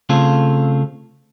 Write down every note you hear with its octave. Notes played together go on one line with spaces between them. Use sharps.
C#3 A3 C4 F4 G#4 A4